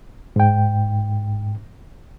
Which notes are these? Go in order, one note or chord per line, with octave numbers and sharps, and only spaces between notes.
G#2 G5